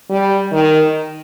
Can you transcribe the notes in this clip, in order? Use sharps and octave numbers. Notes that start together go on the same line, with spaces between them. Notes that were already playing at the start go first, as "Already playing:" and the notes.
G3
D#3